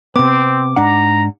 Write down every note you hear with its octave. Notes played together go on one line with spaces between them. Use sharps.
C3 B3 C4 D6
G#2 D4 F#5 A#5